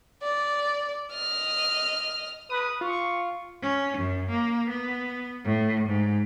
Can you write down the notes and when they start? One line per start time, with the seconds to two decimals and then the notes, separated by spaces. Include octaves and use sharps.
0.23 D5
1.13 D#5 F6
2.50 B4 D#6
2.81 F4 C#6
3.62 C#4
3.98 F#2
4.30 A#3
4.69 B3
5.44 A2
5.88 G#2